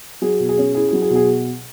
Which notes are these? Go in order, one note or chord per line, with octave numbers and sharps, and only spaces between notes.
F#3 G#4
B2
G#4
C#4
E4 G#4
F#3 G#4
G#4
B2
G#4